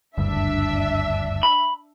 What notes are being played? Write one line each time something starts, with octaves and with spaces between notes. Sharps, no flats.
F#1 D2 G2 D4 E5
B5